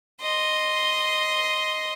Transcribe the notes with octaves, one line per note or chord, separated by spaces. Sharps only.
D#5 C6